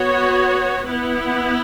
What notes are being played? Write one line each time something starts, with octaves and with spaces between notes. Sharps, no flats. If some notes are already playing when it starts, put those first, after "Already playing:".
Already playing: B3 F#4 C#5
B3 E4 B4